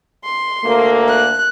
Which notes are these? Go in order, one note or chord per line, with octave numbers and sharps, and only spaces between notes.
C6
D2 A3 A#3
F#6